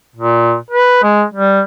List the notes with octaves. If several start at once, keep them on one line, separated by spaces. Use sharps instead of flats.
A#2
B4
G#3
G3